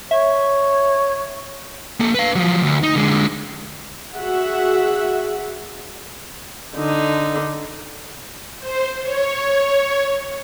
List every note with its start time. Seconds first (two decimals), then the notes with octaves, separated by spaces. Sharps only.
0.11 C#5 E5
2.00 A#3 A4
2.15 B4 F5
2.36 F3 F#3
2.61 D2
2.83 D#4
2.96 D3 G#3
4.15 F#4 G#4 E5 F#5
6.76 D3 D#4
8.59 C5
9.03 C#5